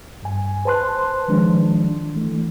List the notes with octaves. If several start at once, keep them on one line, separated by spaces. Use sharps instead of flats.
G2 G#5
B4 C5 A5 C6 F#6
D#3 F3 G#3 D4
E3 A3